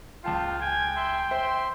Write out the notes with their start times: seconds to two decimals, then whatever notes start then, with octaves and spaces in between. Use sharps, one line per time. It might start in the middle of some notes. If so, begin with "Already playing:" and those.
0.24 C#2 F4 G5 A5 C7
0.61 G5 G#5 G#6
0.96 E5 C6
1.31 C5 E5 C6